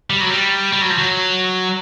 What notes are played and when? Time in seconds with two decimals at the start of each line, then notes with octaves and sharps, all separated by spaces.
0.10 G3
0.21 F#3
0.30 G3
0.73 G3
0.81 F#3
0.90 F3
0.98 F#3